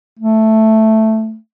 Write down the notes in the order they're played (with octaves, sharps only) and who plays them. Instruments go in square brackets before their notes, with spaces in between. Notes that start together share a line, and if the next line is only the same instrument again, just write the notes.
[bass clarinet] A3